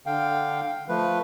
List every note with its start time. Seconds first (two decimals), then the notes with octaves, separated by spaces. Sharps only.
0.06 D3 F5 G5
0.89 F3 A3 B4